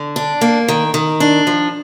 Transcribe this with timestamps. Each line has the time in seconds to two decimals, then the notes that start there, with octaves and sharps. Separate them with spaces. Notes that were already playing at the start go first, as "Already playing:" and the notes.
Already playing: D3
0.16 D4
0.41 A#3
0.68 D#3
0.94 D#3
1.20 D4
1.47 F3